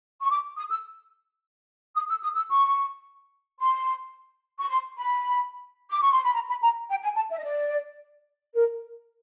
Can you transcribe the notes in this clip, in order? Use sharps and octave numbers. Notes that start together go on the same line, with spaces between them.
C#6
D6
D#6
E6
D#6
E6
D#6
E6
C#6
C6
C#6
C6
B5
D6
C#6
C6
B5
A#5
B5
A#5
G5
G#5
A5
E5
D#5
D5
A#4